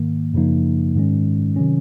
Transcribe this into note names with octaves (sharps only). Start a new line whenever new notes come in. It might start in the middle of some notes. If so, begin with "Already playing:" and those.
Already playing: G#2 D#3 A#3
F#2 C#3 F3 A#3 D#4
G#2 D#3 G#3 C#4
C3 D#3 F#3 C#4